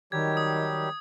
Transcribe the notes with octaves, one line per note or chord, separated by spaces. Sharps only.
D#3 F#3 G3 G4 G#6
D#6